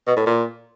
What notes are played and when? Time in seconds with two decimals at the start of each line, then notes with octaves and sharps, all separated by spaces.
0.07 B2
0.17 A2
0.26 A#2